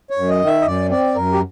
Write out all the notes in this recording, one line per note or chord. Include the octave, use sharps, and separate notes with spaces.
C#5
F#2
D#5
D#3
E5
D#5
F#2 D5
C4 D5
F#2 A#4
G4